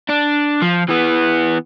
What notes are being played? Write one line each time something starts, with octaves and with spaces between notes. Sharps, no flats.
D4
F3
E3 B3